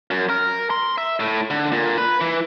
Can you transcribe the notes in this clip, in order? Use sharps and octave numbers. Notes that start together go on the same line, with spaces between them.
F#2
A#4
C6
E5
A2
D3
A#2
B4
E3